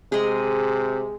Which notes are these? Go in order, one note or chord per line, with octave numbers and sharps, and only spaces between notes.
C3 G#3 G#4